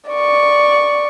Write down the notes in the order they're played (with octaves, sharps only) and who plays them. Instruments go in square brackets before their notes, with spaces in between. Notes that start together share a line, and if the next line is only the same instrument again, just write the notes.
[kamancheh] D5 C#6